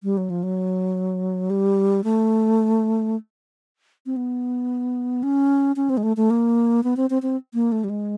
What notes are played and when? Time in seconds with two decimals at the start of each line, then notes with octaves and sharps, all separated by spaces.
0.03 G3
0.17 F#3
0.30 F3
0.43 F#3
1.50 G3
2.04 A3
4.06 C4
4.16 B3
5.23 C#4
5.76 C#4
5.90 C4
5.97 G#3
6.03 A3
6.17 A3
6.30 A#3
6.84 B3
6.97 C4
7.10 C4
7.22 C4
7.54 A#3
7.72 A3
7.84 G3
7.90 G#3